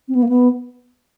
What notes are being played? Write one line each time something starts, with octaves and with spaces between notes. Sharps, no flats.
C4
B3
A#3
B3